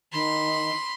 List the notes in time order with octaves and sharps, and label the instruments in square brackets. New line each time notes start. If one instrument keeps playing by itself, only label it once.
[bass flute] D#3 [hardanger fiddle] B5 C6